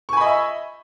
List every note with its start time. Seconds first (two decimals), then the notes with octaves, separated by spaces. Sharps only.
0.09 C#6
0.13 G#5
0.17 B5
0.21 D#5
0.25 E5